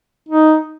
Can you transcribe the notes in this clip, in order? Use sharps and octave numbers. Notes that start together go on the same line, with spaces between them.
D#4